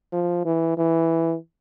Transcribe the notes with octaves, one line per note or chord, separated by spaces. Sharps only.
F3
E3
E3